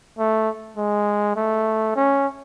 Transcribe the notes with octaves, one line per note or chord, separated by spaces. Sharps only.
A3
G#3
A3
C#4